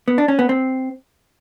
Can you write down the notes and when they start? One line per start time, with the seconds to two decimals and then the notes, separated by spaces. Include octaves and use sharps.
0.08 B3
0.18 D4
0.28 C#4
0.39 B3
0.49 C4